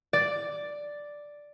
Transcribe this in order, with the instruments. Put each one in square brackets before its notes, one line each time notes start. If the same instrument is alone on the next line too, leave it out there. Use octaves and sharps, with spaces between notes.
[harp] D5